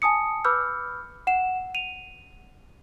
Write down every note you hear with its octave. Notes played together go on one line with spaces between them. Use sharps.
G#5 A5 D#6 C#7
B4 B5 D6 E6 F6 G6
F#5 E7
D#7 F7